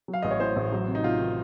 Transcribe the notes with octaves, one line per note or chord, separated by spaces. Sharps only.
F#3
F5
A1 D#5
C#5
A2 C5
A1
F#3
C3
D#4
C3 F4
D#3